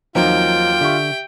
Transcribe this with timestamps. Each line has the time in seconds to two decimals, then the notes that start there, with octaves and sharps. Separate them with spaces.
0.15 D#2 F3 F#3 C4 D#4 F4 G5
0.81 D3 G4 E5 C#6